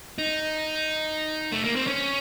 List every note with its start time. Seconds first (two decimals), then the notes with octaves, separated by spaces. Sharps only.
0.18 D#4
1.52 A3
1.64 A#3
1.76 C4
1.87 C#4